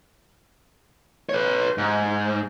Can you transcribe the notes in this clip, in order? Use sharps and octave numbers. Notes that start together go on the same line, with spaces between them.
B4 C#5
G#2